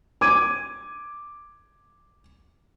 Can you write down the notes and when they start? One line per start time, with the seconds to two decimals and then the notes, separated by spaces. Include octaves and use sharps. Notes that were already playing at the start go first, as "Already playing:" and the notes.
0.21 D6 G#6 D#7